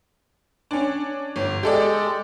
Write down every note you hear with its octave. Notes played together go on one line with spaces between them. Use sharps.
C#4 D4
G1
G#3 G4 A4 D5